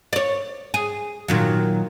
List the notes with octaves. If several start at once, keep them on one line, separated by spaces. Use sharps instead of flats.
C#5 D5
G#4
A#2 D#3 F#3